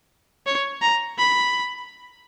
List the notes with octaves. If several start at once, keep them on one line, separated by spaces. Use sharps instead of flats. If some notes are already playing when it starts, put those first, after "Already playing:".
C#5
A#5
B5